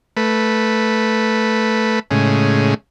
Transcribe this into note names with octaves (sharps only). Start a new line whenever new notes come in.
A3 B4
A2 C#3 G#3